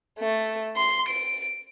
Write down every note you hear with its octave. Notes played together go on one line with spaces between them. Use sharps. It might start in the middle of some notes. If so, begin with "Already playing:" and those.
A3
C6
D7